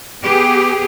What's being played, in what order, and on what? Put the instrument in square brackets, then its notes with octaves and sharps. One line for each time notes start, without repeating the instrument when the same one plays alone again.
[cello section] B3 G4 G#4